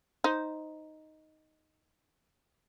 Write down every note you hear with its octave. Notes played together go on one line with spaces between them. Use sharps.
D#4 C5